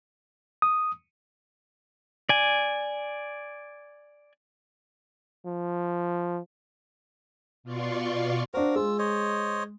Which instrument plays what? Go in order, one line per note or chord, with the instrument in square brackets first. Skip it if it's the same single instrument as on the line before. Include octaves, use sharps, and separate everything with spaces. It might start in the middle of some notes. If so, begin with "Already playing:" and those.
[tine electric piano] D#6
[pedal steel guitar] D5 G#5
[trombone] F3
[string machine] B2 F4 D5 C6 C#6
[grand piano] D4 C5 [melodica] F#4 A#4 F5
[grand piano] G#3 [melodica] F4 E6
[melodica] C5 C#5 D#5